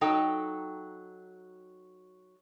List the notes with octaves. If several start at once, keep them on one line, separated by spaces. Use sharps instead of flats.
F#3 D#4 A4 G5